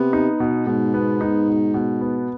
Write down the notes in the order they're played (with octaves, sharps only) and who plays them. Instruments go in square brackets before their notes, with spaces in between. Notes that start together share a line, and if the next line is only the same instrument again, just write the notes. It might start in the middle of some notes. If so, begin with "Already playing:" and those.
Already playing: [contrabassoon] C3 [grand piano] B3
[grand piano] D#4
B2
[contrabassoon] G#2 [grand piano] B2
[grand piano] B3
D#4
B2
B2
B3